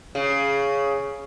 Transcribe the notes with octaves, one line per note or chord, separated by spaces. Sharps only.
C#3